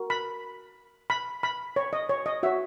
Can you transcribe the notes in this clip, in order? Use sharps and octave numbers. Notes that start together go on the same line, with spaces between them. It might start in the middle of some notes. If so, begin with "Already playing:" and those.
Already playing: F#4 A#4
B5
B5
B5
C#5
D#5
C#5
D#5
F#4 C#5 E5